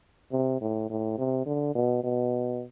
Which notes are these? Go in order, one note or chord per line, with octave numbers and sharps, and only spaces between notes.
C3
A2
A2
C3
D3
B2
B2